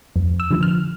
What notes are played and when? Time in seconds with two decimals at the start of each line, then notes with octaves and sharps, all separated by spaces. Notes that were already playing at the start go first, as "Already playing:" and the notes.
0.16 F2
0.40 E6
0.51 D3 F3
0.63 F6